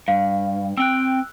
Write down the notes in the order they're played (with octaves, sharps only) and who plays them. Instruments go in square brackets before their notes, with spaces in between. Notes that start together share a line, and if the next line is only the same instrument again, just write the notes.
[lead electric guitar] G2 [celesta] F5
[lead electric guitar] C4 G5 [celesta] E6 F#6